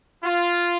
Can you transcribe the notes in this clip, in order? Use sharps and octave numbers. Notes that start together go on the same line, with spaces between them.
F4